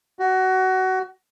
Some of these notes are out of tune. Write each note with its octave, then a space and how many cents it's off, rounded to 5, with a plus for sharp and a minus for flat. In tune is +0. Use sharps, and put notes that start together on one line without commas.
F#4 +20